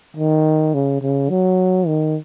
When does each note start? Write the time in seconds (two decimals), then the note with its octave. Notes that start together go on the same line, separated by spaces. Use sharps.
0.17 D#3
0.74 C#3
1.02 C#3
1.30 F#3
1.87 D#3